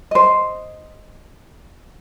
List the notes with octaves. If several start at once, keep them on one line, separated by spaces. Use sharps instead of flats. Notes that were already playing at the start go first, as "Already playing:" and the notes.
C5 D#5